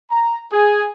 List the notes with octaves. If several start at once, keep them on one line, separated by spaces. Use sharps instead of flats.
A#5
G#4